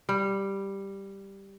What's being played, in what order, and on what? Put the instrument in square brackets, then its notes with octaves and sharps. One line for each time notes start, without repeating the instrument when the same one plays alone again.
[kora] G3